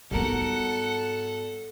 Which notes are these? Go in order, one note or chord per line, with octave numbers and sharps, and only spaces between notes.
G#2 G3 B3 F#4 A4 A#4 F#5